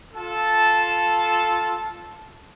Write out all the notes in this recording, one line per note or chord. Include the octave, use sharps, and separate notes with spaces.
F4 A4 A5